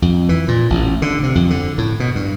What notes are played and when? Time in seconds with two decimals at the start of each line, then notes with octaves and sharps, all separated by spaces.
0.02 F2
0.29 E3
0.48 A#2
0.70 A1
1.02 D3
1.23 C3
1.35 F2
1.50 D3
1.78 A2
2.00 B2
2.15 G2